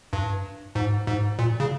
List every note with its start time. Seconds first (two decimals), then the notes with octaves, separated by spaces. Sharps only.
0.13 G2
0.75 G#2
1.07 G#2
1.39 A#2
1.60 C#3